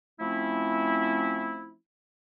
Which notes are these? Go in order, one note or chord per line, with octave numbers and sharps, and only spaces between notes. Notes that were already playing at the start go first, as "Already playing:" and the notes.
F3 A3 C4 C#4 E4